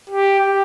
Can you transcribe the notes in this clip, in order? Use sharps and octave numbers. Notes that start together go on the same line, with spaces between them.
G4